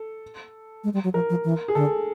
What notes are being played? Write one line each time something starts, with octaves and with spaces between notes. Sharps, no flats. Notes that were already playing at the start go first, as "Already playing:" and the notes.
Already playing: A4
G#3
G3
F#3
F3 A#4
F3
E3
G#4
D3 A4